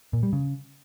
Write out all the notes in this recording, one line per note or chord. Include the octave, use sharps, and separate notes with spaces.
A#2
G3
C#3